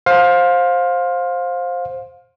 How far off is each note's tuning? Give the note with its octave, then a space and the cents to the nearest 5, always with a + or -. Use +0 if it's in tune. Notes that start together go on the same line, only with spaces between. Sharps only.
C5 +10 F5 +20